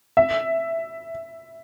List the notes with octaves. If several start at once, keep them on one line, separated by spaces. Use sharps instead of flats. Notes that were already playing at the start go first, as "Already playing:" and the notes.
E5